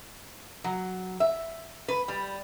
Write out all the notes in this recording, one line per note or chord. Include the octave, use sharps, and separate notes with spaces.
F#3
E5
B4
G3